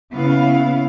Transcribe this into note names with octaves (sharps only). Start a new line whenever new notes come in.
C#3 B3 E4 F5